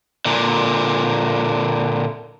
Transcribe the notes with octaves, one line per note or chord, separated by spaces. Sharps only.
A#2 D3